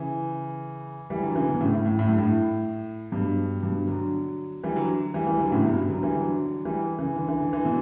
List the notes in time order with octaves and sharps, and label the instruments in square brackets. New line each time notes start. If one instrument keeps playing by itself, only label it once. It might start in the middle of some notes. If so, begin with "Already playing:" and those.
Already playing: [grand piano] C#3 E3
E3 G3
D3 F#3
C#3 E3
B2 D3
A2 C#3
A2
A2
A2
G2
A2
G2 B2
G2 B2
D3 F#3
E3 G3
D3 F#3
E3 G3
E3 G3
D3 F#3
A2 C#3
G2 B2
D3 F#3
E3 G3
D3 F#3
E3 G3
C#3 E3
D3
E3
D3
E3
B2 D3